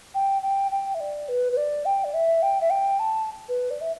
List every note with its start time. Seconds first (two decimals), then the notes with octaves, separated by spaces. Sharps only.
0.15 G5
0.42 G5
0.71 G5
0.95 E5
1.00 D5
1.29 B4
1.53 B4
1.57 D5
1.86 G5
2.04 D5
2.14 E5
2.42 G5
2.61 E5
2.70 G5
2.99 A5
3.49 B4
3.71 D5
3.81 E5